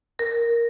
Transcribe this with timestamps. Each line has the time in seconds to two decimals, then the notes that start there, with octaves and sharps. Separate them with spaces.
0.19 A#4